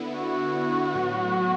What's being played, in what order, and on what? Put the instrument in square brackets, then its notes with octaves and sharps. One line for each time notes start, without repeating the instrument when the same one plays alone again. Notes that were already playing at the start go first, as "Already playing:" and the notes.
Already playing: [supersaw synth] D3 B3 E4
[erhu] F#4
[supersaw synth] A2 F#3 B3